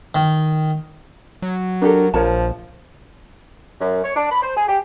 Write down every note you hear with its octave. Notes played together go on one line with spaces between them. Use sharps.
D#3
F#3
D4 G4 A4 A#4
A#1 F3 A#4 C#5 A5
F#2
C#5
D4
B5
C5
G#4
G4